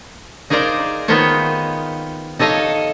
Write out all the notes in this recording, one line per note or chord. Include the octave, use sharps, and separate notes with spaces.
D#4 G#4 A#4 C5 D5 F5
D#3 B3 D#4 F4 C5 C#5
D#4 A4 C#5 D#5 F5